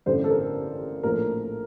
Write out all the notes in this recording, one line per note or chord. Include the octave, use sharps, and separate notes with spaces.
A1 G2 D3 C5
A4
A#4
A#1 A2 F3 A3 A#4